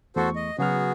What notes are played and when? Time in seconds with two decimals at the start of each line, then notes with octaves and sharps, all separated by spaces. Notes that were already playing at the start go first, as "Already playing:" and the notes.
0.16 E2 A3 F#4 A4 C5 C#6
0.36 D#5
0.58 C#3 F#3 B3 F#4 G#4 F6